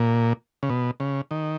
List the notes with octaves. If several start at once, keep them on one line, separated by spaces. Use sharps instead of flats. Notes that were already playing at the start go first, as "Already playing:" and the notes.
Already playing: A#2
C#3
B2
C#3
D#3